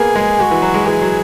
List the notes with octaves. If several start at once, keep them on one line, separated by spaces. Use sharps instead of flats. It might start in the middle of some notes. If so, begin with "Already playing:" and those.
Already playing: A#3 B3 G#4
G#3
G#3 F#4
E3
F#3
G#3
E3 G#4
F#3